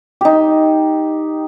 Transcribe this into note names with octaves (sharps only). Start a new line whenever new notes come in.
D#4 G4